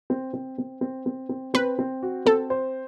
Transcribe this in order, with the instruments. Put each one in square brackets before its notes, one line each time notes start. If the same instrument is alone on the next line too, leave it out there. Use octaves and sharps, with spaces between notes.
[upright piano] C4
C4
C4
C4
C4
C4
[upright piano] C4 [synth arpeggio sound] B4
[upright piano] C4
F#4
[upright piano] C4 [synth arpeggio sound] A4
[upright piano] C5